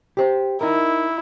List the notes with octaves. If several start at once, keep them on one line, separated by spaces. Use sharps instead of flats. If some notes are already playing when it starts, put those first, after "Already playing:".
G4 C5
D#4 E4 A#4